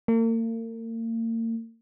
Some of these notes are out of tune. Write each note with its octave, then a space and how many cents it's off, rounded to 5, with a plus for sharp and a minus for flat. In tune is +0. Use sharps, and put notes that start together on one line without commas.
A#3 -40